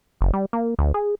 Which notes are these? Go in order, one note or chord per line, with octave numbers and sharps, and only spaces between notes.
F#1
G3
A#3
D2
G#4